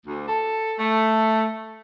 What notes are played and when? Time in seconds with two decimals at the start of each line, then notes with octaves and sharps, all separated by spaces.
0.06 D2
0.28 A4
0.79 A3